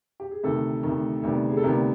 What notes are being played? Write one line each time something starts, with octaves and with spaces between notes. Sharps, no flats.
G4
G#4
D2 C3 D#3 A4
D2 C3 D#3
D2 C3 D#3 G3 B3
G#4
A4
D2 C3 D#3 G3 B3 A#4